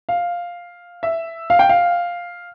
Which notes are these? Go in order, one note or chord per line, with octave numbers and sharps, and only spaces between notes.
F5
E5
F5
G5
F5